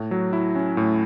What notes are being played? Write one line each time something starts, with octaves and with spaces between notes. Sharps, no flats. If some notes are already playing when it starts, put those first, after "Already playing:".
Already playing: A2
F#3
E4
C#4
A2